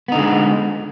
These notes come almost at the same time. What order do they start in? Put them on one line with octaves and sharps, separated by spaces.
B3 D#4 D3 G#3